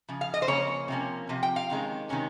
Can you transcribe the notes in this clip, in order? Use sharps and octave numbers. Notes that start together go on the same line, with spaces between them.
C#3 F3
F5
D#5
C5
C#3 F3 A#3 C#4 C#5
C3 F3 A#3 C#4
C3 F3
G5
F5
C3 D#3 G#3 C#4
C3 D#3 G#3 C#4